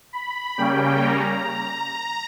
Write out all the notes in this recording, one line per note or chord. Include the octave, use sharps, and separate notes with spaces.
B5
C#3 G3 A#3 C#4 G5
A#5